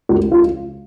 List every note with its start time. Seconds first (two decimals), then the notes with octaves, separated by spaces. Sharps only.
0.09 C#2 F#4
0.32 F4